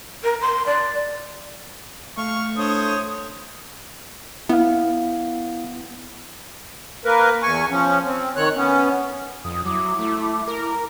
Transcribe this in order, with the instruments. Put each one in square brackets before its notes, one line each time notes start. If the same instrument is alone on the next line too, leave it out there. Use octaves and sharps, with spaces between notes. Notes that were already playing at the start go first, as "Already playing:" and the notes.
[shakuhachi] A#4
C6
D5
[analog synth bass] A3 [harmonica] F5 C#6
[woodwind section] A2 D4 D#6 [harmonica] C5 C#5
[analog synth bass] B3 [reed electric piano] E4 F5
[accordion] A#3 A#4 B4
E2 G#5 C#6
F3 C#4
C4
D#3 C#5 F#6
B3 C#4
[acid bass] F2 [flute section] D#6
[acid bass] F#3 [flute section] E4 D6
[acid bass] A3
A#4